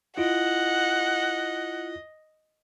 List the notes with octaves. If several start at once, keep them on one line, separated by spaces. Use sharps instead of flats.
E4 F4 D#5 F#5